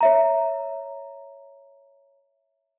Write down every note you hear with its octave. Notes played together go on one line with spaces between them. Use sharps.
C#5 E5 A#5